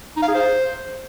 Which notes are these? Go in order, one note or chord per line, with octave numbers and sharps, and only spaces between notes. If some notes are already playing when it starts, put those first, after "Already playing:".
D#4
F5
G#4
C5